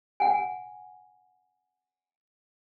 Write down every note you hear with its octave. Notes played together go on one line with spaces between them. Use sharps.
F#5 G#5